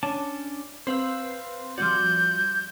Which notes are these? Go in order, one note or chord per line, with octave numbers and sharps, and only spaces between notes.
C#4 D4 A5
C4 B4 C5 F5 E6
F3 G3 F#4 D5 G6